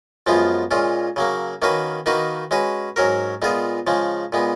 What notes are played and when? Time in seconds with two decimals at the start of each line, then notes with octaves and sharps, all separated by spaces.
0.27 F#2 F3 G#3 B3 F4
0.71 A#2 G#3 C#4 F4
1.16 C#3 F#3 A#3
1.62 D#3 A#3 C#4 F#4 B4
2.06 D#3 A#3 D#4 F#4 B4
2.51 G#3 C#4 F#4 B4
2.96 G#2 F#3 C#4 F#4 A#4
3.42 A#2 G#3 B3 F4 G#4
3.87 C#3 F3 G#3
4.33 A#2 G#3 B3